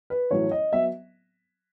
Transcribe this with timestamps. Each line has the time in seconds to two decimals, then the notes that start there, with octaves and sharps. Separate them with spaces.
0.10 B4
0.31 A1 A2 F#3 A3 C#5
0.51 D#5
0.73 F#3 B3 E5